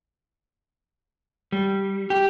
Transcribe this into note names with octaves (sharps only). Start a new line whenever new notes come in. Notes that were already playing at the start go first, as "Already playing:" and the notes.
G3
G4